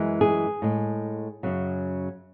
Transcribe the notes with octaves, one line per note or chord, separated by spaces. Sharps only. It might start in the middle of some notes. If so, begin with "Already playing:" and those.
Already playing: F#2 E3 G#3
G#4
A2 G#3
F#2 C#3 F#3